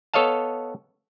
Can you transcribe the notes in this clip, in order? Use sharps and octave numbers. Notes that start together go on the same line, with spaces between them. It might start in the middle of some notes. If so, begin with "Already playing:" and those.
B3 A4 C#5 D#5 F5 A5